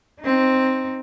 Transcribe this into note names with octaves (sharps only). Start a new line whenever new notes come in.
C4 D#4